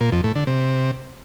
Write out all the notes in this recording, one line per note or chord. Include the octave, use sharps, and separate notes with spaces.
A#2
F2
A2
D3
C3